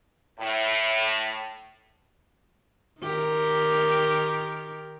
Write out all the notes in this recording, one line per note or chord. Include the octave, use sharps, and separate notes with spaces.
A2
D#3 G4 A#4